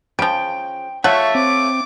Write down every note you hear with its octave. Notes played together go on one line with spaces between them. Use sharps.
C#3 F3 G5
A3 F4 C#5 E5 F#5 C#6
C4 D6